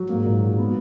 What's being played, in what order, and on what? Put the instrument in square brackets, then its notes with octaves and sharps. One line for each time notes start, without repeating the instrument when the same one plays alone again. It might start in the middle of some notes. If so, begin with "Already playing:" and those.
Already playing: [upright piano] F#3
[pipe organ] G#2 [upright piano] A#3
[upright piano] A#2
F#3
B3